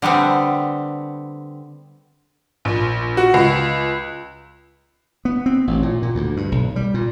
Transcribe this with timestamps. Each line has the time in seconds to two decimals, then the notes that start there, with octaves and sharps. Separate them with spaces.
0.02 D3 G3 B3 C4
2.65 A#1
3.17 F#4
3.34 C#2
5.25 B3
5.46 C4
5.67 A1
5.83 A#2
6.02 A#2
6.15 D2
6.37 G2
6.52 B1
6.76 G3
6.94 A#2